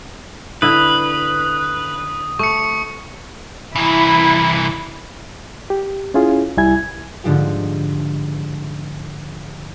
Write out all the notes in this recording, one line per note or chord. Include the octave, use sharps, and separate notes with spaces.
D3 E4 B4 D#6
A3 C#6 C#7
C2 E3 E4
G4
C#4 E4 F4 G#4
C2 G3 E4 G#5 G#6
G#2 D3 F3 G4